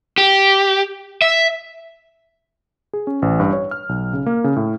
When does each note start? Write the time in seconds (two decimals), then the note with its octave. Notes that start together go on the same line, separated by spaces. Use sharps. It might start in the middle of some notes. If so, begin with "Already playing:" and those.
0.18 G4
1.22 E5
2.93 G#4
3.07 C#4
3.22 A1
3.40 G2
3.53 C#5
3.71 F6
3.89 B1
4.13 C#3
4.26 A#3
4.44 C#3
4.56 A2